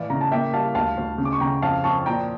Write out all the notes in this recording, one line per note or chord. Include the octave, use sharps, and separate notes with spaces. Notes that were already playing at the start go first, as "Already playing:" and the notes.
Already playing: A2 E3 D5 F5
C#3 A#5
A5
A#3 E5 G5
G3 F5 A5
D2 F5 A5
D2
C#3
D6
C#6
C#3 G5 A#5
F2 F5 A5
F2 A5 C#6
A#2 G5 A#5